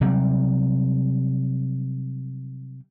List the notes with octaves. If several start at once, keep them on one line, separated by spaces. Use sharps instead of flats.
C3 F#3 G3